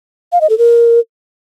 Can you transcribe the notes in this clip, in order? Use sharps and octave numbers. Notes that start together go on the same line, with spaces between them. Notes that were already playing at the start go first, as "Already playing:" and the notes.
F5
D#5
A4
A#4